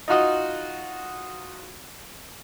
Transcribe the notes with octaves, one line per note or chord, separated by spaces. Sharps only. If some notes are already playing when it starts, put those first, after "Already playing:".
D#4 F4 F#4 D#5